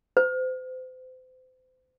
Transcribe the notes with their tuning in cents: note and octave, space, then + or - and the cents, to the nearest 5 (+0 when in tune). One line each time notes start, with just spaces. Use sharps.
C5 -35